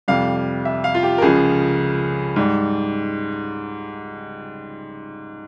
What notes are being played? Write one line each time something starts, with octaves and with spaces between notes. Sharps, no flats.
F2 C3 G3 F5
F5
E5
F5
F4
G4
A#4
C#2 C#3 F3 G#4
G#2 G3